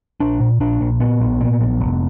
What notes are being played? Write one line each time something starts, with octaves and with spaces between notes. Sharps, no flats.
A#1 D4
A#2
A#1 D4
A#1
A#2 B3
A#1
A#2
A#1
F1